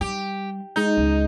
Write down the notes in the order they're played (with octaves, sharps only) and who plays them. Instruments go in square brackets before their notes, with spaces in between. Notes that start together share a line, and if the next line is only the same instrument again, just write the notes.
[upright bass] G3 [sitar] G4
[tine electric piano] G#3 G6 [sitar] D#4
[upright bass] C#2